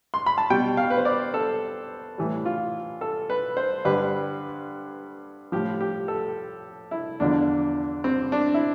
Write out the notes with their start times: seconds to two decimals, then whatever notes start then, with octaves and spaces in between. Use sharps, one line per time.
0.14 C6
0.26 B5
0.38 A5
0.50 B2 G3 G5
0.77 F5
0.90 B4
0.98 C5
1.05 D5
1.34 A4
2.18 A2 E3 G3
2.46 F4
3.01 A4
3.30 B4
3.57 C5
3.85 G2 D3 G3 B4
5.52 A2 F3 G4
5.81 G4
6.08 A4
6.91 E4
7.20 E2 D3 F3 D4
8.04 C4
8.32 D4
8.54 E4